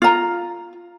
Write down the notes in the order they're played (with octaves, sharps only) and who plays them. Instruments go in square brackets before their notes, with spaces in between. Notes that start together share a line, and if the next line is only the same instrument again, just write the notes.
[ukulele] F4 A#5